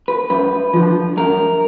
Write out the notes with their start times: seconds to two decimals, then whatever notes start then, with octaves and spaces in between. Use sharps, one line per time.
0.08 B4
0.30 F#2 B4
0.74 D3 F3
1.17 F#2 A#4